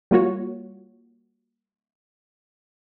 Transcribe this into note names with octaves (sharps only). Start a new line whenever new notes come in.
G3 A#3 F4 F#4 C#5